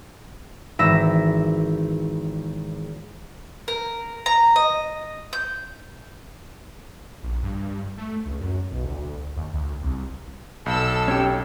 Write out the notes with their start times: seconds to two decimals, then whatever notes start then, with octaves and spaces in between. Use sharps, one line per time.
0.79 G#1 E3 E5 E6 A#6
3.68 A#4
4.26 A#5
4.56 D#5
5.33 G6
7.23 A#1
7.43 G2
7.98 A3
8.26 C#2
8.41 F#2
8.72 B1
8.85 D2
9.36 D#2
9.54 D2
9.82 C2
10.66 B1 A4 E6
11.08 C#4 G4